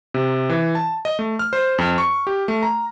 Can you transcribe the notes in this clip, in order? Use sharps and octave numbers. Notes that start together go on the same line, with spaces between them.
C3
E3
A5
D#5
A3
F6
C5
F2
C#6
G4
A3
A#5